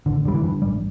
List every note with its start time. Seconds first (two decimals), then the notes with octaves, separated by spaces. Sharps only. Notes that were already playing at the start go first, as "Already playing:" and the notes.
0.06 A1 D3
0.25 D3 G3
0.35 E3
0.44 G2
0.62 A1 G3